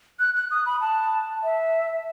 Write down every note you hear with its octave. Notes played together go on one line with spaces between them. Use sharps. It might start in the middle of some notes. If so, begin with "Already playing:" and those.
F#6
F#6
D#6
B5
A5
E5